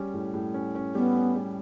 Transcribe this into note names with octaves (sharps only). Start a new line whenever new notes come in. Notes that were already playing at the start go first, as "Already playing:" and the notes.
Already playing: G3 C#4
A2
A2
C#4
C#4
G3 B3
C#4
G3